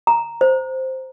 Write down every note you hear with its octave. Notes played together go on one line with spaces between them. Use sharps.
A#5
C5